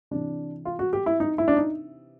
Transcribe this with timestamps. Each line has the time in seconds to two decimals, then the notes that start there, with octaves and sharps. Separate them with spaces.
0.11 C3 E3 D4
0.65 F4
0.79 F#4
0.93 G4
1.06 E4
1.20 D#4
1.38 E4
1.48 D4
1.57 D#4